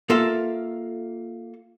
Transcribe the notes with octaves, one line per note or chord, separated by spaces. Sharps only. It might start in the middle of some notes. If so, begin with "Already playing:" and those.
A#3 F4 A4 E5 F5